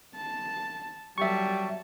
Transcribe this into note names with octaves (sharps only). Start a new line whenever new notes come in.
A5
F#3 G3 E5 A5 C#6